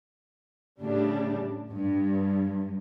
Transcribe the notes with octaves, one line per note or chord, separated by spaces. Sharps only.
A2 C#3 G3 D4
G2